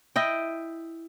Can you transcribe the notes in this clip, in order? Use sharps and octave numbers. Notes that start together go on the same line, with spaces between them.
E4 D#5 G5